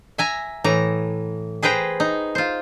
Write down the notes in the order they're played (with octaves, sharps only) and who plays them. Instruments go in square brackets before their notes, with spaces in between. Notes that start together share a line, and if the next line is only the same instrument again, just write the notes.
[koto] E5 G#5 A#5
A2 E3 A#5
G#4 B4 C5 G5 A#5
D#4
F4 C5